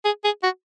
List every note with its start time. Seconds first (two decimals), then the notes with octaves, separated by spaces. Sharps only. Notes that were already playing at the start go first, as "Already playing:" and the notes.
0.05 G#4
0.24 G#4
0.43 F#4